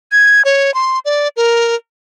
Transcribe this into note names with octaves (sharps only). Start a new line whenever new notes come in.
G#6
C#5
C6
D5
A#4